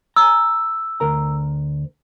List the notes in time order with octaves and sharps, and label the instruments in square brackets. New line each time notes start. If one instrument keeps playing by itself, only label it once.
[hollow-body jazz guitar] G#5 A#5 [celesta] E6
[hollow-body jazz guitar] D2 A#4 A#5